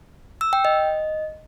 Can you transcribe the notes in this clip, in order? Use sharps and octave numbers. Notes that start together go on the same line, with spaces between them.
E6
G5
D#5